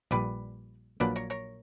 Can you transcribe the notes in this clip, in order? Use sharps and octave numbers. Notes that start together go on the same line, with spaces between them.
A#1 A#2 G3 B4 D5
A#1 A#2 F#3 A#3 D4 B4 D5
A#4 C#5
A#4 C#5